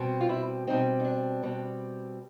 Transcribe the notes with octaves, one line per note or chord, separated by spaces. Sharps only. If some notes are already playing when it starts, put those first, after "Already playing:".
Already playing: B2 G3 C4
F4
E4
B2 G3 C4 D#4
D#4
D4
B2 G3 C4